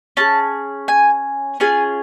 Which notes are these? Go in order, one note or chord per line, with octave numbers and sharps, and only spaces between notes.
C#4 F4 G#4 A5
G#5
C#4 F4 G#4 G#5